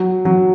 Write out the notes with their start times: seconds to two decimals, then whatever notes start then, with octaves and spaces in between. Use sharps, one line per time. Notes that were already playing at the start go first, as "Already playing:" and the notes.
Already playing: F#3
0.25 F#3